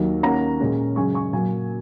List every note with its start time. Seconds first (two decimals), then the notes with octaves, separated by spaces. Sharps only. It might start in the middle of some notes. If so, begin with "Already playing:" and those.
Already playing: D#2 D#3 F#3
0.23 D#2 D#3 A#3 C#4 F#5 A#5
0.60 A#2 G#3 C#4
0.96 F#2 C#3 G#3 G#5 C#6
1.14 G#5 C#6
1.33 A#2 F#3 A#3 G#5